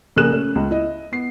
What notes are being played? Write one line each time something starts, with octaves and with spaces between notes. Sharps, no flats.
A#1 C#3 G#4 A#4 F#6 E7
A3 C#4
C#2
E4 D#5
B3 C7